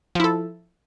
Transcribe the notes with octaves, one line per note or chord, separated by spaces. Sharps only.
F3 E4 A4